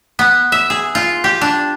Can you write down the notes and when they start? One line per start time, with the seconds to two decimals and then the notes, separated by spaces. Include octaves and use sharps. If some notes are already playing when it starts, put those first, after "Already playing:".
0.19 B3
0.52 E5
0.70 G#4
0.95 F4
1.24 G4
1.41 D4